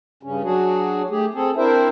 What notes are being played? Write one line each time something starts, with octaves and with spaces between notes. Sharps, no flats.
G2 C#3 C#4
F#3 D4 F#4 G#4
A3 G4 G#4
C4 G#4 A4
C4 D4 E4 A#4 C5 E5